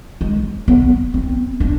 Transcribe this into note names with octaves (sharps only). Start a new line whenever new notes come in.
G#3
B3
C4
D4